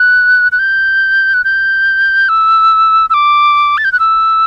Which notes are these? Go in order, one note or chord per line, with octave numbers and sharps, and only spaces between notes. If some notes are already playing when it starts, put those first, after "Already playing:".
Already playing: F#6
F#6
G6
F#6
G6
E6
E6
D6
A6
G6
F#6
E6